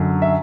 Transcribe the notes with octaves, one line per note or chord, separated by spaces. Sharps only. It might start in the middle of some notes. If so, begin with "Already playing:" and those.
Already playing: F#2 D3
E5